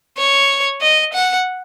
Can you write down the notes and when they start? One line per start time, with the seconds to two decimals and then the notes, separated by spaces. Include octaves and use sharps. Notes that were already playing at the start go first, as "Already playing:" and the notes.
0.18 C#5
0.81 D#5
1.13 F#5